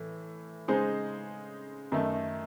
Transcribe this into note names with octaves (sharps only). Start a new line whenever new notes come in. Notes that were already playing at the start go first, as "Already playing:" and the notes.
Already playing: A2 E3
C#3 G#3 D#4 G#4 C5
F#2 D#3 A3